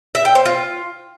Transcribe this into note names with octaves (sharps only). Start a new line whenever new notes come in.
E5
G5
C5
F4